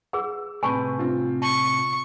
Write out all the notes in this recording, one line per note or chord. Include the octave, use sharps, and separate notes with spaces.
G#4 B4 F#5 E6
A2 C3 B4 G#5 A5 C#6
C4 F4
A5 C#6